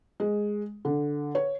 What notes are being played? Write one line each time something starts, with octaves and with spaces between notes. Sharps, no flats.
G#3
D3
C#5